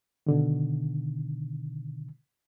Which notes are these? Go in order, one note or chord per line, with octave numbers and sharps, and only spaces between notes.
B2 D3 D#3